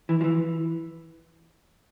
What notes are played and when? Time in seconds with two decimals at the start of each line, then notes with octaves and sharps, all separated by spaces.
0.09 E3
0.21 F3
0.24 E3